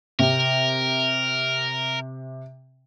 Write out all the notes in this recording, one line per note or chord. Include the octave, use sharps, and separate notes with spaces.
C3 A#4